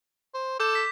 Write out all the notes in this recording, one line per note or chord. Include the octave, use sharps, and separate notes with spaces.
C5
A4 D6 G6
D6 B6